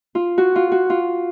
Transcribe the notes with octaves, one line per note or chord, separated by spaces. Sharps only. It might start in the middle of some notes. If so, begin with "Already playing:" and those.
F4
F#4
F4
F#4
F4